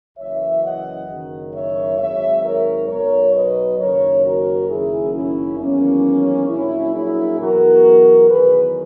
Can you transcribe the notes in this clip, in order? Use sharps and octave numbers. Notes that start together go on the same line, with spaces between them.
F#1 F#2 E3 C#5 E5
D#5 F#5
F#1 F#2 D#3
C#5 E5
G#1 G#2 F#3 C#5 E5
A#4 C#5
B1 B2 F#3 A#4 C#5
B4 D#5
F#1 F#2 D#3 A#4 C#5
F#4 A#4
F#1 F#2 D#3 F#3 E4 G#4
C#4 E4
E2 D#3 F#3 A#3 C#4
A#1 A#2 F#3 C#4 E4
E4 G#4
E2 B2 F#3 F#4 A#4
E2 D#3 F#3 G#4 B4